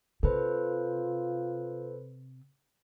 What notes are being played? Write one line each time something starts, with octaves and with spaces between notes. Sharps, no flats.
C3 F4 A4 B4 C5